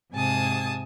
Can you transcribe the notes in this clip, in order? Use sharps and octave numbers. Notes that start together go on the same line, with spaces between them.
G#2 C3 G#5 A5 D#6